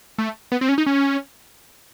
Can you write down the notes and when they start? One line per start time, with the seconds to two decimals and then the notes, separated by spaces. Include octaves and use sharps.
0.18 A3
0.52 B3
0.61 C4
0.69 C#4
0.78 D#4
0.86 C#4